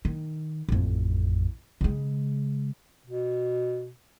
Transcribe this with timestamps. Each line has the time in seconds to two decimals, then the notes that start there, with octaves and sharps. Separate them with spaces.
0.05 D#3
0.69 A1 F2
1.81 C#3 G#3
3.05 B2